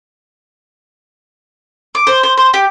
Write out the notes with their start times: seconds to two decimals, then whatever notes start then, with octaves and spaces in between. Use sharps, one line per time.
1.95 D6
2.07 C5
2.23 C5
2.37 C5
2.54 G4